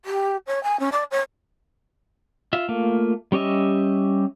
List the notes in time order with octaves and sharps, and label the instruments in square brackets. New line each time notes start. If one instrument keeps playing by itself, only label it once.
[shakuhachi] G4
C#5
G#5
C#4
D5
C#5
[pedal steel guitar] F4 E5
A3 A#3 F4
G3 C#4 G4 D#5 E5